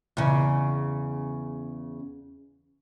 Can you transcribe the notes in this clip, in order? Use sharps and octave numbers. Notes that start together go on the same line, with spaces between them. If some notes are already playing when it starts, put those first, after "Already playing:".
E2 C#3